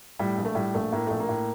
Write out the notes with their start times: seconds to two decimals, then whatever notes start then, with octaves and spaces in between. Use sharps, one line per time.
0.19 A2 G3
0.38 A#1
0.45 A3
0.55 A2 G3
0.74 A#1 A3
0.92 A2 A#3
1.07 A#1 A3
1.20 A#3
1.29 A2